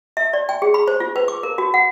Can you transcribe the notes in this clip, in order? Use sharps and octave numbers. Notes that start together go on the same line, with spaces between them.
E5
D5
G5
G#4
B5
C5
F4
B4
D6
A#4
F#4
F#5